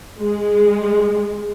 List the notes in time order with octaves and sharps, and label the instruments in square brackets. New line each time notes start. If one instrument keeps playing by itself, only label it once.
[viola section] G#3